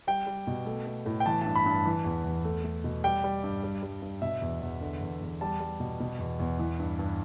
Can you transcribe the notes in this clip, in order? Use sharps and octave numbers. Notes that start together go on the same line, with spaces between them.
G3 G5
G3
B2
A3
A3
A2
G5
E3 A5
G2 A5
B5
G2
A5
E3
E2
E2
A3
A3
B2
G3 G5
G3
G2
G3
G3
G2
B2 E5
E2
E2
D3
E2
E2
G3 A5
G3
B2
B2
E2
E2
E3
G2
G2